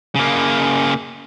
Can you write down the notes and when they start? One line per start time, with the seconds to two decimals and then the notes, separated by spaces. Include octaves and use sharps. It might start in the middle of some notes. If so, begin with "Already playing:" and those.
0.15 C#3 A#3